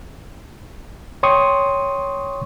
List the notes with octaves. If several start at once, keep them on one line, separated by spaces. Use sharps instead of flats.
C#5 G5 C6 C#6 D#6